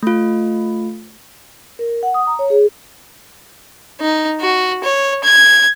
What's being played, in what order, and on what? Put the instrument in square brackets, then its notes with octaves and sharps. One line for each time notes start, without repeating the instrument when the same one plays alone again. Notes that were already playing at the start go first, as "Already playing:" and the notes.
[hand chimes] A3 F4
[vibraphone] A#4
F#5
D#6
A#5
C#5
G#4
[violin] D#4
F#4
C#5
G#6